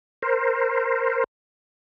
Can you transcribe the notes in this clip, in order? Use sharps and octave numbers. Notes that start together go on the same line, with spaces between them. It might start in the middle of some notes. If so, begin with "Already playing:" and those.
A#4 C5